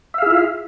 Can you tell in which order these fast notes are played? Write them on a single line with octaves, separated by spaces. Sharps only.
E5 F5 G#4 E4 F4